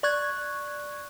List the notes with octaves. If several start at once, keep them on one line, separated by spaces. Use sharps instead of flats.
D5 C#6 F#6 G#6